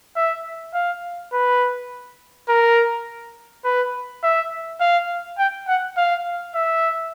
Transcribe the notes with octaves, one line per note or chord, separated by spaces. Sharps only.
E5
F5
B4
A#4
B4
E5
F5
G5
F#5
F5
E5